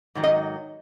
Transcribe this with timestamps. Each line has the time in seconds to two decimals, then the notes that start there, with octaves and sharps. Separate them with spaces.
0.15 G#2 D#3 F#3
0.24 D#5